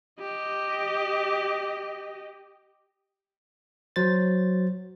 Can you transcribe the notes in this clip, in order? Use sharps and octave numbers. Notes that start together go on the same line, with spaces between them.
G4 D#5
F#3 C5 A6